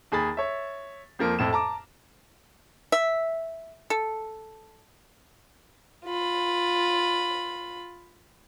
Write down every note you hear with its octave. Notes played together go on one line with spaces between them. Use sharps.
D#2 G#4 B5 A6
C#5 E5
F2 F3 A#3
F2 A2 E7
A5 A#5 D6
E5
A4
F4 B5